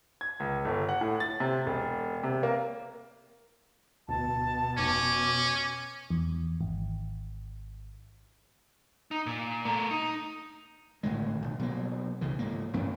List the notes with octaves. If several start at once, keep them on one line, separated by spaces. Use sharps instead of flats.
G#6
C#2
G1
F#5
A2
A6
C3
E1
C3
A#3
D1 B2 A5
F1 C#4 D6
E2
G#1
D#4
A#2
A3 A#4
D#4
G#1 A2 D3 G#3
B1 A#2
B2 F#3 A#3
C2 C#3 E3
G#2 A#3
A1 G2 A#3 C#4